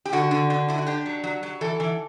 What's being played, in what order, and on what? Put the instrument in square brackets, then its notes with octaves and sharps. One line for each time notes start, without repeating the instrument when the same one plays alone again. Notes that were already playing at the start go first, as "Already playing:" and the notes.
[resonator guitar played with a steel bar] G4
D3 F#4
D3
D3
D3 E4
F#4
D4 G4
F#3
F#3
F#3
E3 A4
E3